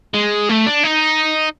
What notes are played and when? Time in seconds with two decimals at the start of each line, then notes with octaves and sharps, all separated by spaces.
0.14 G#3
0.49 A3
0.66 D4
0.83 D#4